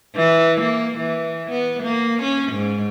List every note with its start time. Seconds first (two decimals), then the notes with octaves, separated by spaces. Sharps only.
0.16 E3
0.60 A#3
0.97 E3
1.50 B3
1.83 A#3
2.22 C#4
2.52 G#2